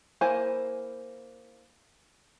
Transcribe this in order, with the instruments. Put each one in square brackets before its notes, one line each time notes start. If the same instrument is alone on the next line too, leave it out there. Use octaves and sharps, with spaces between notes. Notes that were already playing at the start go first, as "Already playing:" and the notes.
[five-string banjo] A#3 E4 C5 G#5